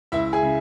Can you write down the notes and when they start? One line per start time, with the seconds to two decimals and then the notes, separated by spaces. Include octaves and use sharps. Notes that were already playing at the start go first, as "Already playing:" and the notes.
0.12 C#2 E4 E5
0.33 G#4 G#5
0.43 C#3